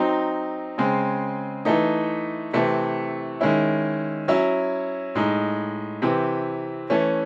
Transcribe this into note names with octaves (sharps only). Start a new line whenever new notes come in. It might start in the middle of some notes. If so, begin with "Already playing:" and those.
Already playing: F#3 C4 D#4
C#3 G#3 C4
E3 A3 D#4
C3 E3 A3 C4
D#3 G#3 C#4 E4
F#3 C#4 E4
A2 G#3 D#4
C3 E3 C4
E3 A3 C#4